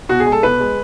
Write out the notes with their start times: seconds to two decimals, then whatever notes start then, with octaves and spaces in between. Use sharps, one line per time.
0.09 B2 F#4
0.20 G#4
0.26 G#3
0.32 A4
0.43 B2 B4
0.60 G#3